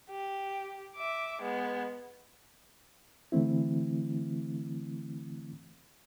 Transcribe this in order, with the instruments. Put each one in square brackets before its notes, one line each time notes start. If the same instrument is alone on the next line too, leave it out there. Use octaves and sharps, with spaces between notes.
[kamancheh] G4
E5 D6
G#3 B3
[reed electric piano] D3 E3 A3 C4 E4